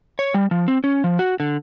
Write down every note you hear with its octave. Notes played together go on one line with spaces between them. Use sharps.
C#5
G3
F3
C4
C#4
F3
F#4
D3